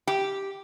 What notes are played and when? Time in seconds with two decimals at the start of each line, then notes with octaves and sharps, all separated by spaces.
0.07 G4